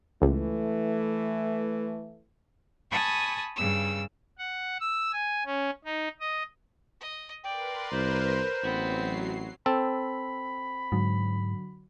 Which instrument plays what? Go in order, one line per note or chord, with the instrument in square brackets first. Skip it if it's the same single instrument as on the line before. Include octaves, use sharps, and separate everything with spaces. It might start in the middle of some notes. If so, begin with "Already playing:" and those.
[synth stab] C#2 [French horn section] E3 A3
[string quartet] G#5 A5 B5 C#6 D#6
G2 C#3 E6
[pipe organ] F#5
E6
G#5
C#4
D#4
D#5
[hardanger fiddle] D#5
[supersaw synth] A#4 B4 C6 [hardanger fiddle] D5 [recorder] G5
[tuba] C2 [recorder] C5
[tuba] A1 [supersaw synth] F#3 C7 [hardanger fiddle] B3 C4
[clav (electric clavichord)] C4 A4 [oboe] B5
[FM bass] G#2 [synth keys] D3 F#3 F#4